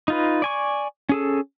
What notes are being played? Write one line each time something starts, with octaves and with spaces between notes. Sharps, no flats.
D#4 F4 B4
D5 G#5 C#6
C#4 G#4 A4